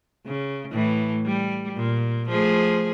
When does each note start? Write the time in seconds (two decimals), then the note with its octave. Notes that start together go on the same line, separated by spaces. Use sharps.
0.26 C#3
0.71 A2 E3
1.26 G3
1.76 A#2
2.29 F3 A3 G#4